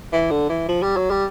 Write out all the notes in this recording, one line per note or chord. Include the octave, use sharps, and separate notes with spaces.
E3
D3
E3
F3
G3
F#3
G3